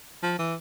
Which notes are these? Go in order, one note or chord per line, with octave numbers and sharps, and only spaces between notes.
F3
E3